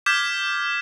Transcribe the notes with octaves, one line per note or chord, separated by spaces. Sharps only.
D6 F6 G6 G#6 B6 E7